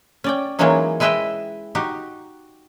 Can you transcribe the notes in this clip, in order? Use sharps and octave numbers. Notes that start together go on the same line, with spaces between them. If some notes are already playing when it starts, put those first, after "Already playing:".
C#4 D5 G5
E3 F#3 G#3 A#3 C#4 D#4
G#3 E4 B4 D#5 E5 G5
D#4 F#4 G4